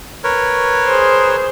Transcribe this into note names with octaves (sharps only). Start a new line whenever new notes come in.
A#4 B4 C#5
G#4 C5